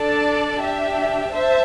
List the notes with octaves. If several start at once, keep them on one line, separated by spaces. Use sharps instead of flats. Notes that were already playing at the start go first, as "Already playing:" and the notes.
Already playing: D4 A4 D5 A5
D4 G4 E5
C5 E5 A5